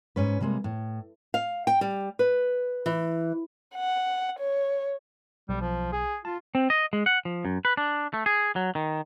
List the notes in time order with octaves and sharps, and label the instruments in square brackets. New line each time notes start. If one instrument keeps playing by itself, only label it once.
[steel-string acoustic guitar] G#2 C#4 B4
C3 G3 G#3 A#3
A2
[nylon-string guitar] F5
G5
G3
B4
E3
[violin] F#5
C#5
[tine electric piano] B1 [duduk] G3
[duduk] F3
G#4
[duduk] F4 [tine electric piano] A5
[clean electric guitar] C4
D#5
G#3
F#5
F3
F#2
B4
D4
A3
G#4
F#3
D#3